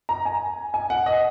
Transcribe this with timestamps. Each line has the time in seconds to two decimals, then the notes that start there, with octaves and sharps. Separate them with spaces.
0.09 A#5
0.25 G#5
0.74 G#5
0.90 F#5
1.06 D#5